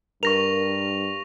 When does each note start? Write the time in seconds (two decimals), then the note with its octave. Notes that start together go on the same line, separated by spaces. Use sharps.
0.23 G2 A#4 C#6 A#6 F7